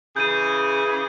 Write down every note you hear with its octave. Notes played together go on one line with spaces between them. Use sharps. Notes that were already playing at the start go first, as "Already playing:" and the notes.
C#3 E3 G#4 G6 D#7